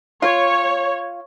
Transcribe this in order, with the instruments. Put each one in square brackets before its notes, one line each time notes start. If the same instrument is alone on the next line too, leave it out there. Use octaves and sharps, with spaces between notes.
[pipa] F4 [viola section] C#5